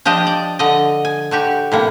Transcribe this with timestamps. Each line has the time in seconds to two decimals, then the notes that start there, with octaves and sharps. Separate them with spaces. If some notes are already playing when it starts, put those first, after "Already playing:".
0.05 F3 D4 G4 D#5
0.27 D5
0.59 D3 D5 D#5
1.05 G#5
1.31 D3 F#4 G4
1.72 A2 C3 A#3